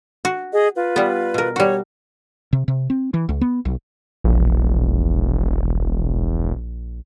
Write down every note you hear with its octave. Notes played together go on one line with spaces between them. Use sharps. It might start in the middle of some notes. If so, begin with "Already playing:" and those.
F#4
G#4 D#5
F4 B4
G3 B3
B2 A#4
G3 F#4 C#5
C3
C3
C4
E3
C#2
B3
B1
E1 A#1